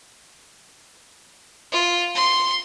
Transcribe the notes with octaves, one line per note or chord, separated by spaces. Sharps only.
F4
C6